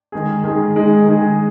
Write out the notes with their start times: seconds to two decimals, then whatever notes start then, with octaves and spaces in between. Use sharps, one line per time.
0.12 D#3 G#3 D#4 G#4
0.44 D#3 G#3 D#4 G#4
0.76 D#3 G#3 D#4 G#4
1.06 D#3 G#3 D#4 G#4